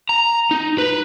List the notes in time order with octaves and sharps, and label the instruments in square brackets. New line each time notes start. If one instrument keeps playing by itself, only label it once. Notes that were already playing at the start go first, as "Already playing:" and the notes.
[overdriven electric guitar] A#5
D#4
B4